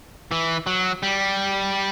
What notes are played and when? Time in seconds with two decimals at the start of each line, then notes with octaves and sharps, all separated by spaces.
0.31 E3
0.67 F#3
1.03 G3